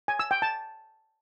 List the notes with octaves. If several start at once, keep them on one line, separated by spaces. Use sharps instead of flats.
G#5
E6
G5
A5